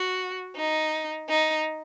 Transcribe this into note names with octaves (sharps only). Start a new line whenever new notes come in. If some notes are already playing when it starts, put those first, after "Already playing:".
Already playing: F#4
D#4
D#4